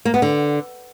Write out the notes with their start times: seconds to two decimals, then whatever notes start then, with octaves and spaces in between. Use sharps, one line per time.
0.05 A#3
0.14 B3
0.22 D3